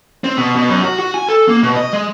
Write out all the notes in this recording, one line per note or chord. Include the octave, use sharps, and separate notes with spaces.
C4
B2
B2
F#2
F#4
F#4
G#5
A4
A#3
B2
D#5
G#3